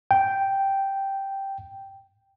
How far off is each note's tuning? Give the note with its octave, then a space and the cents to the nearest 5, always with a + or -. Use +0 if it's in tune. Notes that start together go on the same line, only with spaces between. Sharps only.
G5 -5